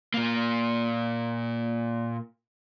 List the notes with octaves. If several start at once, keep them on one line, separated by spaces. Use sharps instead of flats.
A#2 A#3